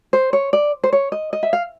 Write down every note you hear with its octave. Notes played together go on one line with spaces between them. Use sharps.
C5
C#5
D5
C5
C#5
D#5
D#5
E5
F5